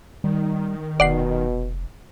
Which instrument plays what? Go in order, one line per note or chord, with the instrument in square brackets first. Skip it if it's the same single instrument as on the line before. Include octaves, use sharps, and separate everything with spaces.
[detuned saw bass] D#3 [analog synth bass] G3
[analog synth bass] F1 [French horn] B2 [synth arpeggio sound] D5 F#5 C7